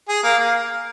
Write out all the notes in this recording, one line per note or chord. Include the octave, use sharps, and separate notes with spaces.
G#4
A#3
A#3